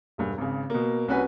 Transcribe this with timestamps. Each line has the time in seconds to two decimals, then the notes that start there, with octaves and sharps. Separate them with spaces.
0.18 E1 B1 G2
0.38 G#1 C#3
0.70 B2 A#3
1.08 C2 C#4 F#4 B4 G#5